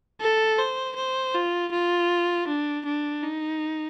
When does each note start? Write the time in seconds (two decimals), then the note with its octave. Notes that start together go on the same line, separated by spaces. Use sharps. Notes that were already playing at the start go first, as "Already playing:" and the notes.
0.21 A4
0.59 C5
0.96 C5
1.35 F4
1.72 F4
2.48 D4
2.86 D4
3.24 D#4